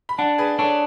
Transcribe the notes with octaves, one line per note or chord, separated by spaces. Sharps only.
B5
D4 F#5 A5
G#4 B4
D4 A4 C#5